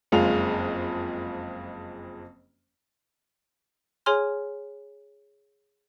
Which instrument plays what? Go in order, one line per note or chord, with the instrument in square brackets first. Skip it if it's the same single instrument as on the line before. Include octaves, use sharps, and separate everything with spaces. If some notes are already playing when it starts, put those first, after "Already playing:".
[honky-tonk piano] F#1 F2 G#3 F4 G#4 F7
[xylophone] G#4 C#5 G#5 C6 F6